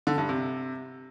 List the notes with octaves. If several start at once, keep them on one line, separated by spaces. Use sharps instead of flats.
D3
G2
C3